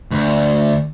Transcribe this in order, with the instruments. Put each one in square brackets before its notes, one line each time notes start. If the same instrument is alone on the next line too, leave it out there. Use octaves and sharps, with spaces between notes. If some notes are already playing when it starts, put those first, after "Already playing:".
[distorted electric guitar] D2